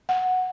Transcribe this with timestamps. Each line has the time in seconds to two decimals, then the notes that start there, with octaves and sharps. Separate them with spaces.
0.09 F#5